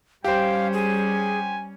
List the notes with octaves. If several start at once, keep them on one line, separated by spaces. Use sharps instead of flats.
G3 C#4 G4 C5 F5 G5
G#4 G#5